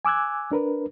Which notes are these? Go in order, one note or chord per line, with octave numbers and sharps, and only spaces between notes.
G#5 D6 E6 F#6 G#6
D4 A#4 B4